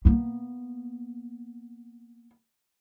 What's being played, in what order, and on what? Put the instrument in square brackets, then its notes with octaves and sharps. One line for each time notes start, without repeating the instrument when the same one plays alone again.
[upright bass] A#3 B3